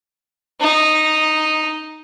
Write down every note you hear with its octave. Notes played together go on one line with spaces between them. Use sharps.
D#4